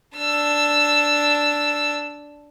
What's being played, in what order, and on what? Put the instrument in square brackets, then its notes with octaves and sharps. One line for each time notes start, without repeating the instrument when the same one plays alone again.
[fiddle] D4 E6